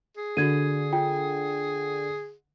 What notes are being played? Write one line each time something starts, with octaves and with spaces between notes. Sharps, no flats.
G#4
D3 F#4 G#6 D#7
F4 G5